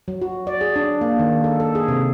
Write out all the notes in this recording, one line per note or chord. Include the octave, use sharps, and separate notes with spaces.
F#3
F#4
D5
G#4
D4
A#3
D#3
A4
A4
G#4
C3